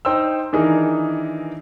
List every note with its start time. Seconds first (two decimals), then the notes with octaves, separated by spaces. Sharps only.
0.05 D#4 C5 G5 E6
0.52 D#3 E3 D4 D#4 G#4 A#4